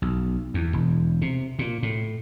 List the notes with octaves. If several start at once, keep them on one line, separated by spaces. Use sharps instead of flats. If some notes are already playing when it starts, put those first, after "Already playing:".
B1
E2
E1
C3
A#2
A2